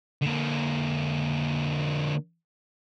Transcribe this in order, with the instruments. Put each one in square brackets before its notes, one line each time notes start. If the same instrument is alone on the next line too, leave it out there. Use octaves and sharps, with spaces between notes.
[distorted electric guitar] D3 A#3